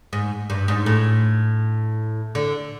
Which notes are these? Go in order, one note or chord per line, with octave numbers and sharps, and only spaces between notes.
G#2
G2
G#2
A2
D3